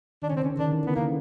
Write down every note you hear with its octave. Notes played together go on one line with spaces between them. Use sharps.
D#3 D4
C#3 C#4
C4
C#3 C#4
D3
D#3 D4
E3
D3 B3
C#3 A#3